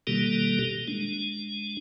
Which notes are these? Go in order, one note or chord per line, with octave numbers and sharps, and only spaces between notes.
B2 D#3 G3 A#3 G4 A4
G#3 D4